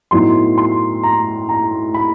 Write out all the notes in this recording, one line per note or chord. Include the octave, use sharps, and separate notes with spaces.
A2 F#3 B3 D#4 C6
C6
A#5
A#5
B5